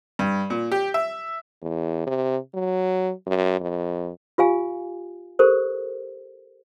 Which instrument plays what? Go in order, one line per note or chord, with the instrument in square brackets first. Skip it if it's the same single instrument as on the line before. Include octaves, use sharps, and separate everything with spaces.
[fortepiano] G2
A#2
G4
E5
[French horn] E2
C3
F#3
F#2
F2
[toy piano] F4 G4 F5 G#5
G4 A4 A#4 C5